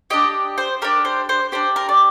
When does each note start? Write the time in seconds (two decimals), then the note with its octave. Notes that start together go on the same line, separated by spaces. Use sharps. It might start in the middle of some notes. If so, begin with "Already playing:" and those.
0.10 D4 G4 D#5
0.58 C5
0.82 D4 G4 A#4
1.05 C5
1.29 C5
1.52 D4 G4 C5
1.76 A#4
1.89 D5